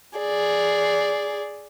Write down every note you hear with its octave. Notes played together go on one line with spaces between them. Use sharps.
G#4 D5